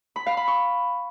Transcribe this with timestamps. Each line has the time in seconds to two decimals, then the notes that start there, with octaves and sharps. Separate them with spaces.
0.16 B5
0.26 F5
0.37 B5
0.48 C#6